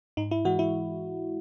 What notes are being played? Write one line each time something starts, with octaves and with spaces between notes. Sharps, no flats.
G#2 D#4
E4
E3 G#3 F#4
E4